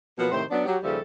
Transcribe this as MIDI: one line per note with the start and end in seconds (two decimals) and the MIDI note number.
0.18 0.27 47
0.18 0.27 53
0.18 0.27 54
0.18 0.27 58
0.18 0.27 71
0.18 0.27 78
0.32 0.43 45
0.32 0.43 48
0.32 0.43 51
0.32 0.43 72
0.50 0.65 54
0.50 0.65 59
0.50 0.65 61
0.50 0.65 62
0.65 0.76 54
0.65 0.76 67
0.83 0.98 39
0.83 0.98 49
0.83 0.98 53
0.83 0.98 55
0.83 0.98 69
0.83 0.98 76